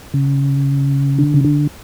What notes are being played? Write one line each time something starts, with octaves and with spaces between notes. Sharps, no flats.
C#3
D3
C#3
D3